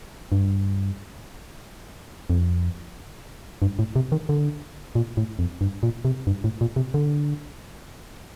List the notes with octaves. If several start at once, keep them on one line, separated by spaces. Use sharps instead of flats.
G2
F2
G2
A2
C3
D#3
D3
A#2
A2
F2
G2
A#2
C3
G2
A2
A#2
C3
D3